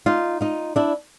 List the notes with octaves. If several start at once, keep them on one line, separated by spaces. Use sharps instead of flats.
D#4 F4
D#4 F4
D4 E4